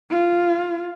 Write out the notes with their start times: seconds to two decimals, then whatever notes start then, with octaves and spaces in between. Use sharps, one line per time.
0.11 F4